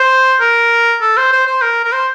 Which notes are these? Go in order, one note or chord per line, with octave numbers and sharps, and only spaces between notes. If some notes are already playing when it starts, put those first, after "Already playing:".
Already playing: C5
A#4
A4
C5
C5
C5
A#4
A#4
C5